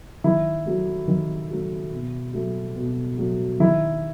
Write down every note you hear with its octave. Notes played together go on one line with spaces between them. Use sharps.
D#3 E4
F#3 A3
D#3
F#3 A3
B2
F#3 A3
B2
F#3 A3
D#3 E4